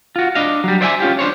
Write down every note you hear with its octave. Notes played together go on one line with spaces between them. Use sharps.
F4 F#4
D4 D#5 F5
F#3 G3
C5 D5 E5 F#5 G#5
C#4 F4 G4
D4 C5 C#5